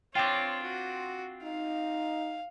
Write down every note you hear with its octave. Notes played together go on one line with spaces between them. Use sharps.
C4 D4 F4 C#5 G5 D6
F#4
D#4 F5